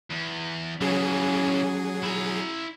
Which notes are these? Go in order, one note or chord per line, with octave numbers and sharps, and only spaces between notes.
E2
C#3 E3 F#3 C#4 G#4
E4 A#5